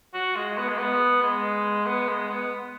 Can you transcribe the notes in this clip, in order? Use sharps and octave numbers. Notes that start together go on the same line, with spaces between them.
F#4
G#3
B3
G#3
B3
G#3
B3
G#3
B3